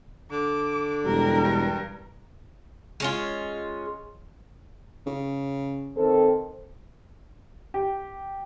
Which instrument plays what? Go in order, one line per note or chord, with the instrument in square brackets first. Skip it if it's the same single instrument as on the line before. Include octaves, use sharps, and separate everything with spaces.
[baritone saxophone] D3 [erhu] D6
[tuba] E1 [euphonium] G3 [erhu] A#4
[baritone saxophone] G2
[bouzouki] G#3 C#4 F4
[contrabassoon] C#3
[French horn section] D#3 C4 A4
[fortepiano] G4